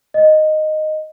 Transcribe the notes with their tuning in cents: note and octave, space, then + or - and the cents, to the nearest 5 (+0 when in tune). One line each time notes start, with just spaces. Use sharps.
D#5 -5